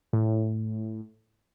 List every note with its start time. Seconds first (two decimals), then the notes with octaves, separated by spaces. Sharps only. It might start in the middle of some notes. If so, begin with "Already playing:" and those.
0.13 A2